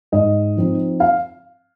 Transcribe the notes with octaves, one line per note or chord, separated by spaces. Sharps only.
G#2 D#5
F3 C4 D#4
F5